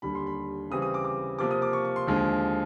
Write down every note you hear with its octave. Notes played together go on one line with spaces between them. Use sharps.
D#2 D3 G3 B5
C6
B5
C#3 E3 G3 C4 D#6
D#6
D6
D6
C3 F3 A#3 D6
D#6
D6
C#6
C#6
C6
D#2 D3 F3 G#3